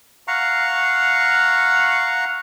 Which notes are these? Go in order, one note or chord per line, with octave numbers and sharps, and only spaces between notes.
F5 F#5 A#5 C#6